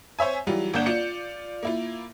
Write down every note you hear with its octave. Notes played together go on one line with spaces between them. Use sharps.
C5 C#5 E5 G#5
E3 F#3 G3 F4
G1 A#3 D4 F#5 G6 E7
F4 D5 C#7
A#3 E4 F4